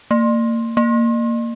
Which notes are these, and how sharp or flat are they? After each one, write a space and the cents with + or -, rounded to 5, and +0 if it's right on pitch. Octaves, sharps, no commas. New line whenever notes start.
A#3 -30
A#3 -10